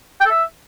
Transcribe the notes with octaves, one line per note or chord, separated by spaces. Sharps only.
G5
A4
E5